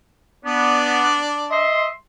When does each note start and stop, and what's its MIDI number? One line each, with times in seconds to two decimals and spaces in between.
0.45 1.19 59
0.45 1.70 62
0.45 1.70 74
1.51 1.89 75
1.51 1.89 76
1.51 1.89 84